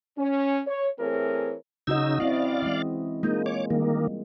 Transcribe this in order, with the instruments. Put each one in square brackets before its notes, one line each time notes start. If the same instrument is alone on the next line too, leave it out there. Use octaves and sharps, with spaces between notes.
[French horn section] C#4
C#5
E3 A3 C4 G#4 A#4 C#5
[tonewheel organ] C#3 D#4 E6 [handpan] C#4 F#4 D#5
[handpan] C4 E4 [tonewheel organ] D5 F5
[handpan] E3 G#3
[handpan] G#3 A#3 F4 [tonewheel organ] D#4
[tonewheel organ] C#5 D6
[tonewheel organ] D#3 A#3 [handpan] G3